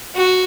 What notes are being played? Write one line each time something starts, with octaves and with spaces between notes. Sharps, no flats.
F#4